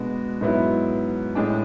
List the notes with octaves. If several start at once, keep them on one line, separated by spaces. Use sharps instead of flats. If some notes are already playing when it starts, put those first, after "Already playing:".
Already playing: B2 G#3 B3 D4 F#4
G#2 F#3 B3 E4
A2 G#3 D4